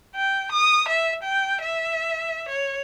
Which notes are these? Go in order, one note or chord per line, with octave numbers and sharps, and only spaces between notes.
G5
D#6
E5
G5
E5
C#5